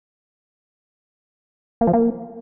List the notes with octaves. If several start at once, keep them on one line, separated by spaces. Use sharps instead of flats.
A#3
F3
A#3